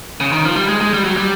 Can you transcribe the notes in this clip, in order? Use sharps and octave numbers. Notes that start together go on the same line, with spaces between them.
C#3
D#3
F3
G3
G#3
G#3
G3
F#3
G3